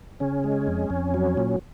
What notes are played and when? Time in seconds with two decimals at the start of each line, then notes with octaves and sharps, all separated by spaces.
0.20 C#3 C#4
0.44 G#3
0.67 F2
0.90 F2
1.14 F#3
1.37 A#2